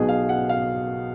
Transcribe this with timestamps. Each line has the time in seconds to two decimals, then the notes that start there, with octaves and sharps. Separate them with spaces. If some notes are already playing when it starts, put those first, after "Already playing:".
Already playing: B1 B2 F#3 G#4
0.09 F5
0.29 F#5
0.49 F5